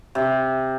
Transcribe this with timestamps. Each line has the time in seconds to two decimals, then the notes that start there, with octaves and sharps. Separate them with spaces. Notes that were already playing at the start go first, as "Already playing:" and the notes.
0.15 C3